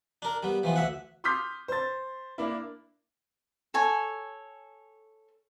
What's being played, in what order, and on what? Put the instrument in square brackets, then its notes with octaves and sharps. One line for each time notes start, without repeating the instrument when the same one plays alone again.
[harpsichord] D4 A#4
G3 B3
E3 F3 B3
D2 E5 F#5
[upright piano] C6 D6 D#6 F6 G6 B6
C5 A6
A#3 D4 E4
[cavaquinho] A4 C#5 G#5